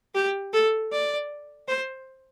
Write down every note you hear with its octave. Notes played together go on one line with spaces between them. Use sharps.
G4
A4
D5
C5